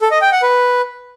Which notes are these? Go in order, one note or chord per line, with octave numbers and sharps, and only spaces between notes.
A4
D#5
G5
F#5
B4